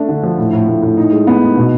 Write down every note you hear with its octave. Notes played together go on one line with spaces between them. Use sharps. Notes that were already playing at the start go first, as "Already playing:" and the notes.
Already playing: A3 D4
D3
F3
A2
A2
A2
A2
D#4
G#3
B3
D#4
B2